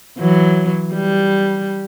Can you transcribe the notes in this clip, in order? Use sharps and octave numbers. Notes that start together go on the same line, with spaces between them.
E3 F#3
G3